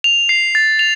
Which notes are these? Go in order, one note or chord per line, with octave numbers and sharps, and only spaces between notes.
F7
C7
A6
F7